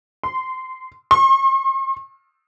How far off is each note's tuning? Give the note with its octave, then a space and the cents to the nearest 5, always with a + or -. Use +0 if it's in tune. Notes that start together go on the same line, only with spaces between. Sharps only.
C6 -20
C6 +45